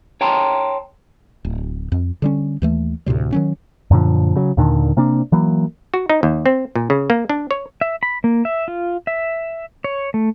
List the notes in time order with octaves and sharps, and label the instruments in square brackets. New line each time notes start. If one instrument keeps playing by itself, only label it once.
[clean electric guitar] C#5 G5 A5 A#5 C6
[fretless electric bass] D1
F2
D3 G3 C#4
D#2 E3 A3
D2 A2 C3 G3
D#3 F#3 C#4
[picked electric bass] F#2 A#2 D3 F3
C#3 F#3
D#2 A#2 D3 D#3
C3 A#3 C4 D4
E3 F#3 A#3
[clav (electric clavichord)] F#4
D#4
D#2
C4
A#2
C#3
A#3
D4
C#5
[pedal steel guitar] E5
B5
A#3
E5
F4
E5
C#5
A3